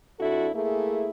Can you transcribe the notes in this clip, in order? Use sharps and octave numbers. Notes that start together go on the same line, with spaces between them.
F2 D4 E4 F#4 A4
A3 A#3 E4 G#4